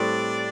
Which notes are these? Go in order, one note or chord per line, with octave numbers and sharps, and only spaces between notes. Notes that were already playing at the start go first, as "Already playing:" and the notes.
Already playing: A2 G3 C4 D4 D5